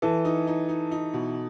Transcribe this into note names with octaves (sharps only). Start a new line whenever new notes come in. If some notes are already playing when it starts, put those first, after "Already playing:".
E3 A4
D#4
D#4
D#4
D#4
B2